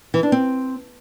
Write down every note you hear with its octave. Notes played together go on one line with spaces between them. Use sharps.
E3
D4
C4